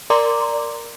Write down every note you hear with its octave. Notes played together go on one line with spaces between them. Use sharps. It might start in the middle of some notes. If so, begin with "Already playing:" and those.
A#4 D5 A#5 C6 D6